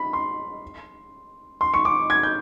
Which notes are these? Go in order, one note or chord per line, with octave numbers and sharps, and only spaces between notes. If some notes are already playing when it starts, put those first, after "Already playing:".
Already playing: B5
C6
C6
C#6
D6
G#6
G6